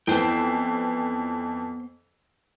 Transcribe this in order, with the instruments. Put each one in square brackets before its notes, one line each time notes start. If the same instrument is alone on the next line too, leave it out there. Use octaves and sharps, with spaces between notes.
[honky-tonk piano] F2 E3 [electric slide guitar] B3 C5 G5 [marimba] E4